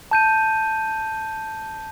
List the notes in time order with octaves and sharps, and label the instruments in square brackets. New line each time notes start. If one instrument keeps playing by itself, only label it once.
[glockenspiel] A5 G6 D#7